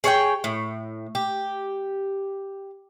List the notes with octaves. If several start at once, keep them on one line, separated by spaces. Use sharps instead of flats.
G#4 C#5 D#5 G5
A2
G4